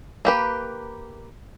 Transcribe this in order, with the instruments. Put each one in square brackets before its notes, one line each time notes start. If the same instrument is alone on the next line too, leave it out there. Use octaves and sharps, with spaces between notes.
[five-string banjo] A#3 G4 B4